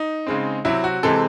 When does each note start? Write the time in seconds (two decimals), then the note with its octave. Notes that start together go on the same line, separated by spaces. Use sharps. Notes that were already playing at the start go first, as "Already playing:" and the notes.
Already playing: D#4
0.27 C#3 G#3 C4
0.65 C3 F#3 C4 E4
0.84 F#4
1.03 C3 E3 G#3 C4 A4